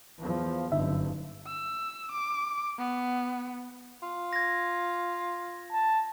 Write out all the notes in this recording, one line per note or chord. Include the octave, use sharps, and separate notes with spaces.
E2 F3
F#1 G2 D3 D#4 E5
E6
D6
B3
F4
G#6 A#6
A5